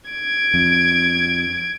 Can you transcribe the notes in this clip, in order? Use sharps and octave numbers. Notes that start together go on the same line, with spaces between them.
G#6 D7
F2